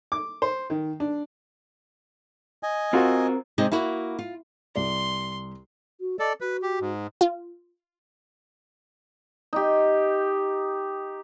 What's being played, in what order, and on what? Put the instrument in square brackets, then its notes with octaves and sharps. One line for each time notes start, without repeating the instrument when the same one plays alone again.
[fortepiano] D6
C5
D#3
D4
[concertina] D#5 G#5
[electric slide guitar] C4 A#4 [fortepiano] F4 F#4
[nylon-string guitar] C3 G#3 C4 D#4 D#5
A#3 E4 F#4
F4
[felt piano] C2 D5 [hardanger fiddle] C6
[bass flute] F#4
[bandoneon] A4 D5 [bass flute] D#5
[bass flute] F#4 [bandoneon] B4
[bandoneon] G4
G#2
[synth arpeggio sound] F4
[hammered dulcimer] D#4 G4